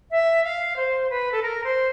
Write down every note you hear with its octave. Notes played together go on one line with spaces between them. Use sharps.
E5
F5
C5
B4
A4
A#4
C5